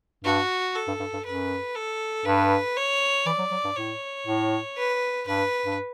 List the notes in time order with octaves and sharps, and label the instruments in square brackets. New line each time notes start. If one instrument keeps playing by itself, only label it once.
[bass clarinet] G2 [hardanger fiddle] F#4
[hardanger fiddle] A4
[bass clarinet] G2
G2
G2
[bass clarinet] F#2 [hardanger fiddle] B4
[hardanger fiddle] A4
[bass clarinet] G2 [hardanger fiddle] B4
[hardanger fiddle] C#5
[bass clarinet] E3 [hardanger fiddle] D5
[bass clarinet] F#3
F#3
G2
[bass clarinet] A2 [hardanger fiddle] C#5
[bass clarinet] A2
[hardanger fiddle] B4
[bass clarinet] G2 [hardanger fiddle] B4
[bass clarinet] G2